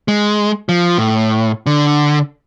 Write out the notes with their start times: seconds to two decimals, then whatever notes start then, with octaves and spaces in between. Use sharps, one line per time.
0.08 G#3
0.69 F3
0.98 A2
1.66 D3